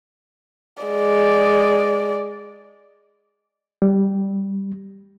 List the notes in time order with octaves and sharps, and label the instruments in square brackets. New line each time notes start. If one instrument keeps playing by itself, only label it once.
[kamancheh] G#3 D5
[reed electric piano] G3